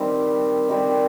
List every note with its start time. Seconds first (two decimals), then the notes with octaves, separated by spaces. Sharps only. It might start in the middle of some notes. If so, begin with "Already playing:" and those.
Already playing: D#3 G3 C4
0.69 D#3 G3 C4